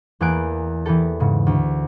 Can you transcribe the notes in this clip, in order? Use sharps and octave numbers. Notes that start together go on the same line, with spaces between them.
E2 A#3 B3 G#5 F#6 D7
E3 B3 G4 A4
G#2 C#3
D2